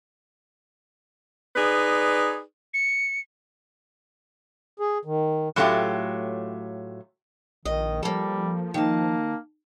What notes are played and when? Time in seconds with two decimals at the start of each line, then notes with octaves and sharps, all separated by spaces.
1.55 D#4 G#4 B4 D5
2.74 C#7
4.80 G#4
5.05 D#3
5.56 A2 F#3 A3 C#4 F4 G4
7.65 A#1 D#3 D#5
8.03 F3 G3 A#3 A4
8.74 D#3 A#3 A5